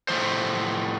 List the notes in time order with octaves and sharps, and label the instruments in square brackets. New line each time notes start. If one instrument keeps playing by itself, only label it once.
[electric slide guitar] A2 F3 A3 C5